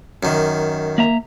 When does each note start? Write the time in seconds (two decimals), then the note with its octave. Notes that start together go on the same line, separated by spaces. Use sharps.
0.23 F#2 D#3
0.98 A#3 E5 A#5